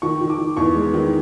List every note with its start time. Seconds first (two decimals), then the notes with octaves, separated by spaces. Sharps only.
0.02 D#3 C#6
0.21 D#3
0.30 D6
0.38 D#3
0.57 E2 C#6
0.75 G#3
0.93 D#3